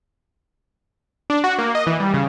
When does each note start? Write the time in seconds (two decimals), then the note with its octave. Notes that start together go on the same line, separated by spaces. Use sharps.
1.30 D4
1.44 F#4
1.58 A#3
1.75 D#5
1.87 E3
2.00 G3
2.14 C#3